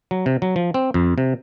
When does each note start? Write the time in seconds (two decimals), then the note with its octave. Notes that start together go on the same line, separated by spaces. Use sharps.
0.11 F#3
0.26 C3
0.42 F#3
0.56 F3
0.74 C4
0.94 F2
1.18 C3